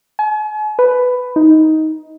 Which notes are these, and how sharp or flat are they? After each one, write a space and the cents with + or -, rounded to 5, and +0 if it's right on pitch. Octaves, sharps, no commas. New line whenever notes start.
G#5 +45
B4 +10
D#4 +15